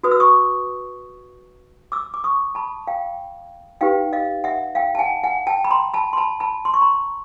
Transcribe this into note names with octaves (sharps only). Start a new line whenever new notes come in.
F#4 B4 D#6
E6
C#6 D#6
D6 E6
D6
C#6 D#6
A5 B5
F5 G5
D#4 G4 B4 F5 G5
D#5 F5
E5 F#5
F5 G5
A5
F#5 G#5
F#5 G#5
G5 A5
B5
A#5 C6
A5 B5
C6
A5 B5
A5 B5
C6
C#6
A#5 C6